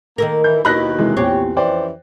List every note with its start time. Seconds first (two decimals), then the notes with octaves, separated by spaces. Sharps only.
0.18 D#3 A#3 A4 A#4
0.44 E3 G6
0.65 D#2 B2 D#3 E4 D#5 B5 F#6 A#6
0.99 C3 E3 G#3
1.17 A#1 E2 C4 G4 C#5
1.57 F2 E3 C#4 C5 D5 G5